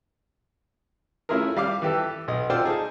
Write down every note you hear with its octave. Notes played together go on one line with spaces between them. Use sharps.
A3 C#4 E4 F4 G#4 A#4
G3 F5 D6
E3 G4 A4
B1 D#5
F4 A4 C5 D5 G5
D#4 G#4 A5